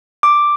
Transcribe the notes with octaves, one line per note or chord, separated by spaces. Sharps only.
D6